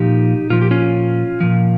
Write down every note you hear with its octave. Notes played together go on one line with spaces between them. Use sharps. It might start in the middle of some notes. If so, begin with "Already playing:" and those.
Already playing: A#2 F3 D#4 G4
A#2 F3 F4
G4
C#4 F4
A#2 F3